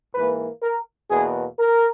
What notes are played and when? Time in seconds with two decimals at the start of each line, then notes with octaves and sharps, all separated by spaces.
0.15 G#2 E3 A#3 B4
0.63 A#4
1.11 E2 B2 A#3 G#4
1.59 A#4